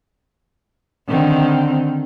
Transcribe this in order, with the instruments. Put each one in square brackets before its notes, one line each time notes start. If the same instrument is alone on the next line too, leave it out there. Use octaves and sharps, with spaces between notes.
[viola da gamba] D3 D#3 C4